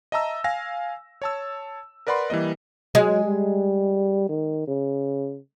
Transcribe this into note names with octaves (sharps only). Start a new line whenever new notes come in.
D#5 E5 A5 A#5 E6
F5 G#5 A#6
C#5 A5 E6
A#4 B4 D5 F#5 B5 C6
E3 G3 A#3 D#5
F#3 G#3
G3
D#3
C#3